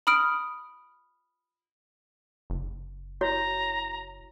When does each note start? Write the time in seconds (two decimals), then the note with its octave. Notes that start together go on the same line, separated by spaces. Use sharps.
0.07 B5 D#6 F6 D7
2.50 F#1
3.21 E4 F#4 C#5 A#5